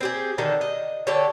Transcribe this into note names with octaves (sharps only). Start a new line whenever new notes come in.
C4 G4 G#4
D3 D#3 D#4 A4
D#5
D3 G4 A4 C#5